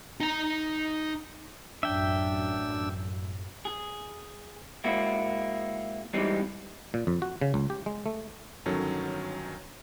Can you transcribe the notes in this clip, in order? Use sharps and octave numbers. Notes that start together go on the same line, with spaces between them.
D#4 A#5
A1 F#2 D4 E5 G5 E6
G#4
G#3 A#3 C4 E4 F#4
E3 G3 G#3 C4 D#4
A#2
F2
F#4
C#3
C#2
G4
G#3
A3
G1 D#3 F#3 C#4 A4